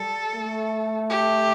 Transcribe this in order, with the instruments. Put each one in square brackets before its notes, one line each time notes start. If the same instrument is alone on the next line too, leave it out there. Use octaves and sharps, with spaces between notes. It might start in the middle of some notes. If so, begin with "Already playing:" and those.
Already playing: [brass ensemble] G3 [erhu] A4
[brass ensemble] A3
[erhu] G4